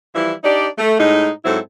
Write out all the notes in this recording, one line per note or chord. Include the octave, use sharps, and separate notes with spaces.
E3 F3 G3 E4
D4 D#4 G4 D5
A3
A2 G#3 D#4
G#2 F#3 C4 E4 A4